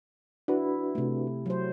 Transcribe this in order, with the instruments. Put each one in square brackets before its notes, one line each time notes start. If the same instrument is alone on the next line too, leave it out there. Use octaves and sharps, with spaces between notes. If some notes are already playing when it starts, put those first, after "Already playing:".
[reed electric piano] D4 F#4 B4 [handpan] E4
[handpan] C3 A3
F#3 C5